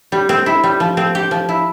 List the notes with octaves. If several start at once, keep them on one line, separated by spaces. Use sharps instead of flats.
G3
C4
E4
G3
F3
C4
G4
F3
E4